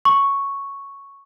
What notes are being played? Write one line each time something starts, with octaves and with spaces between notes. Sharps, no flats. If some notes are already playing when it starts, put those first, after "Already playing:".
C#6